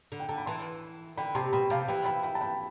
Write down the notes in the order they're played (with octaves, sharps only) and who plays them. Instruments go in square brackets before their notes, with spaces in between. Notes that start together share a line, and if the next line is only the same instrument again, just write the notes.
[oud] D3
[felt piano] G5
[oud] D3 [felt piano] A5
[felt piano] B5
[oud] E3 [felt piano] A5 C6
[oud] D3 [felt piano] G5 B5
[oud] C3 [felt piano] A5 C6
[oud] B2 [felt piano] G5 B5
[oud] C3 [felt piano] F5 A5
[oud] E3 [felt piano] G5 B5
[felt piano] G5 B5
G5 B5
A5
G5 B5